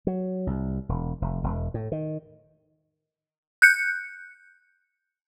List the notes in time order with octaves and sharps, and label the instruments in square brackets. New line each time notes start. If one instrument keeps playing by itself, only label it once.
[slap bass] F#3
C2
E1
F1
E1
A2
D#3
[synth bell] F#6 G6 C#7